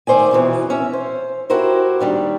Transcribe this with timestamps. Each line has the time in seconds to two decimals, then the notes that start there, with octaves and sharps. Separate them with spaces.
0.07 D#3 A3 C5 D5 G#5
0.31 F2 B2 E3
0.70 C#4 E5
0.93 C5
1.50 E4 F#4 G4 A#4 C5
1.99 D#2 D#3 G3 D4